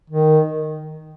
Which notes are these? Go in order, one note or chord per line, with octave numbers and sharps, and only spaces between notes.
D#3